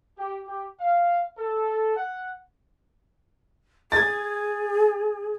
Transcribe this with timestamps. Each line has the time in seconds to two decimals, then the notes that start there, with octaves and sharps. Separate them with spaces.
0.18 G4
0.47 G4
0.80 F5
1.38 A4
1.97 F#5
3.92 G#4 G#6 A6